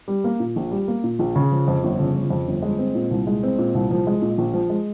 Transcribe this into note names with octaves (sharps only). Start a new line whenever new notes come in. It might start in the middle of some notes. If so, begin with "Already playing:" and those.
G3
A#3
A#2
A#1
G3
A#3
A#2
A#1
C#3
F3
F2
G1
C#3
F3
F2
G1
G#3
C4
A#2
C2
G#3
C4
A#2
C2
F3
G#3
A#2
A#1
F3
G#3